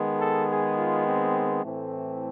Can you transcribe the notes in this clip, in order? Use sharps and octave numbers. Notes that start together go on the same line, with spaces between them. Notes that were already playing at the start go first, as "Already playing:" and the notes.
Already playing: D#3 G#3 B3
A4
G#4
F4
C4
A2 E3 A3 C4